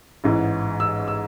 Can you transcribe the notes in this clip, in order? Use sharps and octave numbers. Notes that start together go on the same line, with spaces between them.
A1 G#2 E3
E6
E6